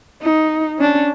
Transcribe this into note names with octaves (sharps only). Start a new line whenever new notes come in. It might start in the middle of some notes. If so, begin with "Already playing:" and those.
D#4
C#4 D4